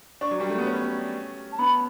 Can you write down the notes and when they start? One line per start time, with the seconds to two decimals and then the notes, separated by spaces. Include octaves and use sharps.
0.21 D4 C#6
0.31 F#3
0.40 G3
0.49 A3
0.58 B3
0.67 C#4
1.52 A5
1.59 B3 B5